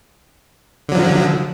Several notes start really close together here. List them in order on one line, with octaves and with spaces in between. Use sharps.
D3 F#3 F3